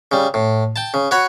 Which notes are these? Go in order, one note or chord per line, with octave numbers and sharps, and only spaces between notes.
C#3 G3
A2
G5 A5
C#3
F#4 C#5 F#5 B5